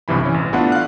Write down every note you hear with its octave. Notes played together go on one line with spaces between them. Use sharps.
B1 G2 C3 E3 B5
E3 C#4
A1
A3 B3 D4 E4 F4 F#5
F5 F#6